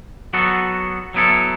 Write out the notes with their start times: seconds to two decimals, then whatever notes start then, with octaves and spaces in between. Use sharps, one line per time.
0.33 F#3 B3 F#4 A4
1.14 F#3 B3 E4 A4